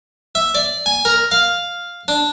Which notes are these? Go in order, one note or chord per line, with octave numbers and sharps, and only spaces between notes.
E5
D5
G#5
A#4
F5
D4